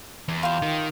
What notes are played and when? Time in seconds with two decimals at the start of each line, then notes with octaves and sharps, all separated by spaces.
0.28 E2
0.43 F4 G4
0.62 D#3